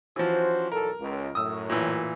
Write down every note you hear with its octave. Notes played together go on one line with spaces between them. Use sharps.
E3 F3 C#4 F#4 C5
B1 E2 A4 A#4
C#2
F#2 A2 D#6 E6
A#2 E3